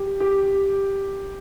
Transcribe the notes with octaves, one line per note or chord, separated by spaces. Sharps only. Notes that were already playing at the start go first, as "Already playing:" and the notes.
Already playing: G4
G4